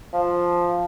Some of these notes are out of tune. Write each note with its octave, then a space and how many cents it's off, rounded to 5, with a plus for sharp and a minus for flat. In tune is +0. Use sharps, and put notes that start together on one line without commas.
F3 +0